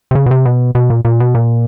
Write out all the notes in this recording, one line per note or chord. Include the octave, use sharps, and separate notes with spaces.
C3
C#3
B2
C3
B2
B2
A#2
A#2
B2
A#2